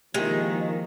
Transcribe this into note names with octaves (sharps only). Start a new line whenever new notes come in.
D#3 F3 G#3 A#3 E4 G4